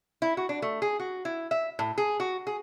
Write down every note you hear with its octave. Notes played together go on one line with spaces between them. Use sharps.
E4
F#4
D4
A3
G#4
F#4
E4
E5
A2
G#4
F#4
G#4